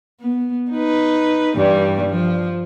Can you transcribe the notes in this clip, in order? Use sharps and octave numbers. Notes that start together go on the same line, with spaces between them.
B3
D#4 B4
G2 E3 G3
F3